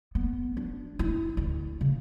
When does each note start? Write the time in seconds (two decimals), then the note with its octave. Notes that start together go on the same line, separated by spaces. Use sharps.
0.15 B3
0.57 D4
0.99 E4
1.37 D2
1.81 C#3